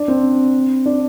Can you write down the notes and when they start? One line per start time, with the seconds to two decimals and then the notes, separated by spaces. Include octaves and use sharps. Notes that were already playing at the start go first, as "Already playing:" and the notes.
Already playing: D4
0.08 C4
0.86 D4